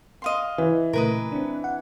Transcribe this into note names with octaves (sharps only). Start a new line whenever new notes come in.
D#5 F5 C6
E3
A#2 C#3 A3 A#4 B4 D#5
C4 D4
F#5